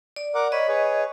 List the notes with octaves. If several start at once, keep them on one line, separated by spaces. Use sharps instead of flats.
D5
A#4 F#5 D6
C#5 D#5 B5
G#4 B4 C#5